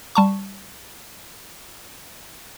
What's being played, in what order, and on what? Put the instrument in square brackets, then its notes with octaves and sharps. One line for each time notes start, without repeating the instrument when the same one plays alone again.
[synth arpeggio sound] G3 A5 C#6